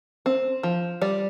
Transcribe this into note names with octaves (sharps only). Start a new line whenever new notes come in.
C4
F3
G3 D5